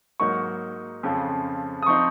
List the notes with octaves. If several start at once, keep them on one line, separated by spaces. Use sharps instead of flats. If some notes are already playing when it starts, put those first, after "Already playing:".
G#2 F#3 A#3 D#4 C#6
F2 C#3 F3
D#6
F3 C4 D#4 C#6